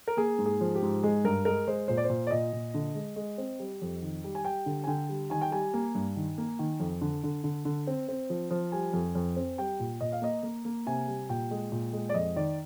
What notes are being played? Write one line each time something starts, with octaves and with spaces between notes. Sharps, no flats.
A#4
A#3 G#4
G#2
G#4
F3
G4
G#2
G#3 G#4
G2 A#4
G#3 A#4
G#3 C5
A#2 C5
D5
A#2 C5
D5
A#2 D#5
A#2
D3
G#3
G#3
C4
G3
F2
D#3
G3
G#5
G3 G5
D3
G#5
D3 G5
G3
D#3 G#5
G5
G3 G#5
A#3
G2
D#3
A#3
D#3
F2
D3
D3
D3
D3
C4
C4
F3
F3
G3 G#5
F2
F2
C4
G3 G5
A#2
A#2 D#5
F5
A#3 D#5
A#3
A#3
C3 G#5
G3
A#2 G5
G#3
A#2
G#3
D5
F2 D#5
D#3 D5